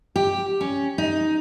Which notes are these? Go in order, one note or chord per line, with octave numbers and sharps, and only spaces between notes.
G4
C#4
D#4